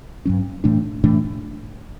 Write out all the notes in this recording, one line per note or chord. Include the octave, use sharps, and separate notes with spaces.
G2 F#3 C#4
A2 E3 A3 D4
A2 E3 A3 D4